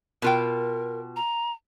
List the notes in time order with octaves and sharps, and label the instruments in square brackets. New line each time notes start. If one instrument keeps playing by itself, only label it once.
[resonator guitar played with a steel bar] B2 F4 G5 [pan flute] A#4
[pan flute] A#5